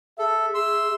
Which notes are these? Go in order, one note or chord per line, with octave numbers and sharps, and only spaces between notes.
G#4 A4 E5
G#4 C6 E6